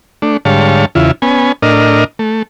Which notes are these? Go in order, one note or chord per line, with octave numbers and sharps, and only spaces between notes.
A3 D4
G#2 D3 G3 C#5 F5 A5
E2 C#3 E4 F4
B3 C#4 G#5
A2 D4 A#4 D#5 F6
A3